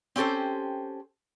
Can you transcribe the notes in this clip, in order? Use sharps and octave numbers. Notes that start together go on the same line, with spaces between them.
C4 C#4 G4 A4 C5